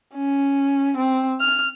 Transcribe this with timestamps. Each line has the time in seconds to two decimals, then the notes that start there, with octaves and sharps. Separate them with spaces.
0.15 C#4
0.97 C4
1.41 F6